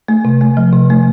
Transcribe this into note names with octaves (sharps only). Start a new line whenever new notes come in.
A3
C3
A3
F3
C3
A3